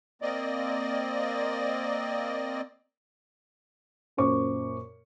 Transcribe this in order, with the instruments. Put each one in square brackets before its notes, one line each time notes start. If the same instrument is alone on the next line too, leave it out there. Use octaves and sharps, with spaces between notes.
[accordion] A#3 C4 D5 D#5
[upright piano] F#2 A#2 C5 C#6 D6